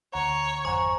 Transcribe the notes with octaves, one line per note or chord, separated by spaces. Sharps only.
D2 C#5 F#5 A#5
G#1 F2 C5 F#5 G#5 A#5 C#6